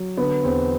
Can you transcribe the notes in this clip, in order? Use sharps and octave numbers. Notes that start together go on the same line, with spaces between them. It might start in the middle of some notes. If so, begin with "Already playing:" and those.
Already playing: F#3
D3 B3
E2 C4